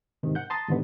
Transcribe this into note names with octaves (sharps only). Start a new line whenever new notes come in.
G#2 C3 D#3
F#5 G6
A5 A#5 C6 D#6 A6
G#2 B2 D3 D#3 G3 B3